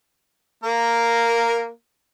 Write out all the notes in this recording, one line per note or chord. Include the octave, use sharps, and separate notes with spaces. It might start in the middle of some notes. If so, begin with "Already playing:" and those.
A#3 A#4